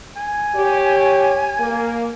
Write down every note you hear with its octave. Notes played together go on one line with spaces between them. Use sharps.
G#5
G4 C#5
A#3